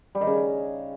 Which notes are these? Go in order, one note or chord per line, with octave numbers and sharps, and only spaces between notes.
G3
D#3
C#3